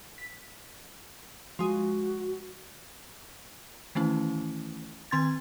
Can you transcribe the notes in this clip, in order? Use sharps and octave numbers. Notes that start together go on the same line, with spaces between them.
B6
F3 G#3 F#4
D#3 E3 A3 C#4 E4
D#3 C4 C6 G#6 A6